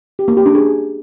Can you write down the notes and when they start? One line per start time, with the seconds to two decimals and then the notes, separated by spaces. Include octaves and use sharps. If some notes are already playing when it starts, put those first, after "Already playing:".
0.19 G4
0.28 A#3
0.37 G4
0.46 D4
0.55 G#4